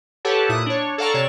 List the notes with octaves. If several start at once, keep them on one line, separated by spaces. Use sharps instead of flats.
G4 A4 B4 C#5 F#5 A5
A#2 E4 D#6 F#6
D4 C#5
A4 D5 F5 F#5 A#5 C#6
C3 C#5 D5 E7